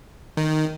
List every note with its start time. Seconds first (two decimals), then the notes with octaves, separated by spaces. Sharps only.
0.37 D#3